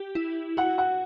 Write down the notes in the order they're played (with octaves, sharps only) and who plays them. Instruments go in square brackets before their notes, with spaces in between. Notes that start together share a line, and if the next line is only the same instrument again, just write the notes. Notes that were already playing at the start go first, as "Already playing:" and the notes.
Already playing: [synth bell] G4
E4
[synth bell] F#4 [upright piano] F#5
[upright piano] F#5